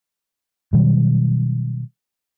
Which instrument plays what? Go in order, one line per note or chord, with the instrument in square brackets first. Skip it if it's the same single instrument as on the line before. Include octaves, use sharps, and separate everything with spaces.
[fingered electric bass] B2 D#3 F#3 G3